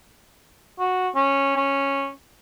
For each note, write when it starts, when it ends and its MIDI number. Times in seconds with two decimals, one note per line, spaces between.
0.79 1.08 66
1.15 1.52 61
1.56 2.11 61